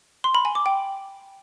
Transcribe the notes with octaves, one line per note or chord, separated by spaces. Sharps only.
C6
B5
G#5
D6
G5